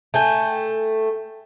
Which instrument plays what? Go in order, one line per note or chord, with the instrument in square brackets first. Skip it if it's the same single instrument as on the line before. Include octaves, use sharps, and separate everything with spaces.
[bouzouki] A3 G5 G#5